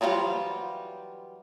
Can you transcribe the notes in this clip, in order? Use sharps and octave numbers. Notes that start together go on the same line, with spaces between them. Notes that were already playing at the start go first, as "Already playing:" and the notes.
E3 F#3 G3 F4 C5